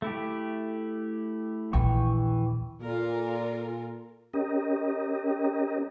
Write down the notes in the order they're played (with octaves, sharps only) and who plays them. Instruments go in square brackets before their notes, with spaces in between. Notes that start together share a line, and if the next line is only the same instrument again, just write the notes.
[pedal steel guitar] A3 E4 G4
[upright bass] A#1 D#2 [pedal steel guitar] E3 G5 C#6
[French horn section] A#2 [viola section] F4 A4 A#4
[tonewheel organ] C#4 G4 A#4 D#5